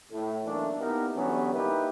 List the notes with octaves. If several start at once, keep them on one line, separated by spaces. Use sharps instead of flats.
A2
B1 E3 A3 A#3 D4
A#3 B3 D#4 E4 G4 A#4
D3 E3 F#3 G3 B3 C#4
A#3 D#4 E4 G4 B4